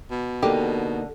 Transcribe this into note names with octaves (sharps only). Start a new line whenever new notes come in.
B2
D3 A#3 D#4 G4